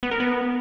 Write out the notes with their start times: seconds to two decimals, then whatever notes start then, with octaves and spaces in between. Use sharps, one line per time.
0.03 B3
0.11 A#4
0.20 B3